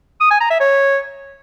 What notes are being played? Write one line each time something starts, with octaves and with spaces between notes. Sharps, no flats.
D#6
G#5
A#5
E5
C#5